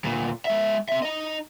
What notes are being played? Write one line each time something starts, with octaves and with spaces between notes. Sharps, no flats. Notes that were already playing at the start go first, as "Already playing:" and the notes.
D2 A#2
G#3 E5
C4 E5
D#4 D#5